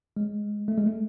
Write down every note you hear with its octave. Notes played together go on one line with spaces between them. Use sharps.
G#3
A3
G#3
A3